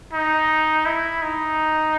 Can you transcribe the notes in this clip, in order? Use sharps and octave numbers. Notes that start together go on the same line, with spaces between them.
D#4
E4
D#4